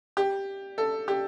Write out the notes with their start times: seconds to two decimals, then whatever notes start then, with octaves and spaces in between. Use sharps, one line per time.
0.17 G4
0.78 A4
1.08 G4